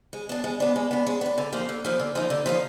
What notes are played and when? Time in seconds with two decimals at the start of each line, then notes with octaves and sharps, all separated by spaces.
0.13 G#3
0.29 B3 D4
0.44 G#3
0.60 B3 D4
0.76 G#3
0.91 B3 D4
1.06 G#3
1.21 B3
1.26 D4
1.38 D3
1.53 F3 A#3 D#4
1.69 D3
1.84 F3 A#3 D#4
1.99 D3
2.15 F3 A#3 D#4
2.30 D3
2.46 F3 A#3 D#4